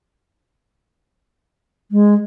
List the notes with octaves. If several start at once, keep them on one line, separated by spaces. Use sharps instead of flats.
G#3